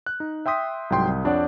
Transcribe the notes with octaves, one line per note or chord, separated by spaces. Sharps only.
F#6
D#4
E5 G5 C6 D#6 B6
C2 G#2 F#3 G5 C6 G6
C2
F2 D4 C#5 D5 F#5